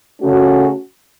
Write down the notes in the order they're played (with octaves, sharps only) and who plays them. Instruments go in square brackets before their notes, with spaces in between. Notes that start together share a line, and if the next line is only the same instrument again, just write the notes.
[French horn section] C#3 A3 C#4 F#4